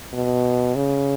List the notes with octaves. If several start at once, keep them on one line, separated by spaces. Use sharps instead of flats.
B2
C#3